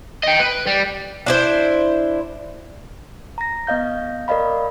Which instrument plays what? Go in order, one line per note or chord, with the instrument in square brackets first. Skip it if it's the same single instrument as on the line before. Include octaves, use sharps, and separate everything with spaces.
[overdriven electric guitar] D#5 G5
B4
G3
[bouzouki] D4 E4 C5
[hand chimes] A#5 A#6
B3 D#5 F5 G6
A#4 D5 D#5 F5 B5